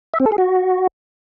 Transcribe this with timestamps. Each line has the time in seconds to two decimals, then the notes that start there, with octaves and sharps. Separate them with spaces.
0.14 E5
0.20 C4
0.26 A4
0.32 G#4
0.38 F#4